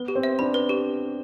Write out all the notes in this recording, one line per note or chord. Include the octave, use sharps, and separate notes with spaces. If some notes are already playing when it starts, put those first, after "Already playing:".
Already playing: B3 B4
G4
C4
E5
D4 B5
B4
G4